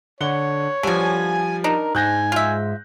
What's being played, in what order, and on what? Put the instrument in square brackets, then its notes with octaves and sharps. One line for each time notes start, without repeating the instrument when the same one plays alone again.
[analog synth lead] D3 [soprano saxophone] C#5 [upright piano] F#5 G7
[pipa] B2 D3 [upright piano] F3 G3 [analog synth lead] G#5
[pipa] D4 D#4 [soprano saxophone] A#4
[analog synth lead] G#2 [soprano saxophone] G#5 [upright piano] F#6 G6 A#6
[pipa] F4 E5